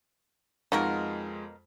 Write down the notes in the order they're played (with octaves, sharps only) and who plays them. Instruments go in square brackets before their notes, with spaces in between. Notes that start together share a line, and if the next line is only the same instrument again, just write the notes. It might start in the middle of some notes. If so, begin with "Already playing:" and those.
[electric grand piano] F2 G#3 F4 [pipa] B2 A#3 A#4 [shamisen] D#4 F#4